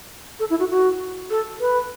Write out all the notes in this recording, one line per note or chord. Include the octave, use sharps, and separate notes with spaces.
A4
E4
F#4
F#4
A4
B4